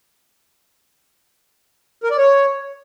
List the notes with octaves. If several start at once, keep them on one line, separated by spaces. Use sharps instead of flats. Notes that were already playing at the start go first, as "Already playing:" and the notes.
A#4
D5
C#5